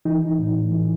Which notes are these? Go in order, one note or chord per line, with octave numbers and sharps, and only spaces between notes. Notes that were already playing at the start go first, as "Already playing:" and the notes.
E3 D#4
A2
E3